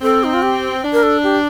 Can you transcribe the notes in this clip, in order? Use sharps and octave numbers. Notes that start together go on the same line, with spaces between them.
C4 A4
D#4
F4
G4
D4
A#4
A4
G4